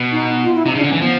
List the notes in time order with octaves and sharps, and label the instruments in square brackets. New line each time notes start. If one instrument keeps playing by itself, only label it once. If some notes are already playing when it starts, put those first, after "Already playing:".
Already playing: [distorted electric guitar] B2
[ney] D#4
F4
E4
[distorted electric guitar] C3 [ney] D#4
[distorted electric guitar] C#3 [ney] D4
[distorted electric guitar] D3
[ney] C#4
[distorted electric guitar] E3
[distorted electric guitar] F3 [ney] B3